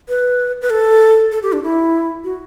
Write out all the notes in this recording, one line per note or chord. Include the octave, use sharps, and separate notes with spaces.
B4
B4
A4
A4
G4
D4
E4
F#4